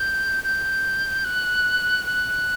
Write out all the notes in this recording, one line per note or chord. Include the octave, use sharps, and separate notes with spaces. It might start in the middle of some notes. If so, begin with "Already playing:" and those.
Already playing: G6
G6
F#6
F#6